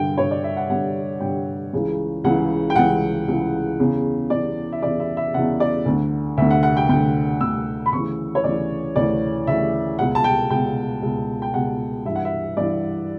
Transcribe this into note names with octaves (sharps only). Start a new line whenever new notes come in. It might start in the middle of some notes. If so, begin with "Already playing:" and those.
Already playing: G2 D3 G5
G2 D3 C#5
D5
E5
F#5
G2 D3 F#5
G2 D3 G5
C#2 C#3 E3
C#2 C#3 E3 F#5
G5
C#2 C#3 E3 F#5
C#2 C#3 E3
E2 C#3 E3
E2 C#3 E3 D5
E5
E2 C#3 E3 D5
E5
E5
E2 C#3 E3 F#5
D5
D2 D3
D2 D3 E5
F#5
F#5
G5
D2 D3 G5
D2 D3 E6
B5
D2 C#3 E3 C#6
C#5
D2 C#3 E3 D5
D2 C#3 E3 D5
D2 C#3 E3 E5
C#2 B2 F#5
A5
G5
C#2 B2 G5
C#2 B2
G5
C#2 B2 F#5
G2 E3 E5
F#5
E5
G2 E3 D5